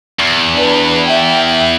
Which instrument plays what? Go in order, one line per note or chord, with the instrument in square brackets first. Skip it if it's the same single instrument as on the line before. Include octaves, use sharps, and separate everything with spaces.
[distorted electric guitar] E2
[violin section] D4 B4
E5 G5